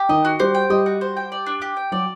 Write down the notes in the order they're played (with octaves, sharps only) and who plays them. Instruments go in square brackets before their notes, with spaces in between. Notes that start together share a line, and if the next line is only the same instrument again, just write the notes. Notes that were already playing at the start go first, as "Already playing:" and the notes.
Already playing: [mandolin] G4
[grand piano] D#3 D#4 [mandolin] D#5
[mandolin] F#4
[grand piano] G3 G4 [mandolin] C5
[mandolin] G5
[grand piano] G3 G4 [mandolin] D#5
[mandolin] F#4
C5
G5
D5
D4
G4
G5
[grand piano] F#3 F#4 [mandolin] D5